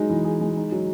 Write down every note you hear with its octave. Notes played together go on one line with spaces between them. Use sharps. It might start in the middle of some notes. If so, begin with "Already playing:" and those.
Already playing: F#3 G#3 D#4
E3
G#4
G#3
D#4
F#3